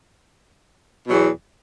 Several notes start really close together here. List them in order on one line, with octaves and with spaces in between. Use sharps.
B2 F#3 E2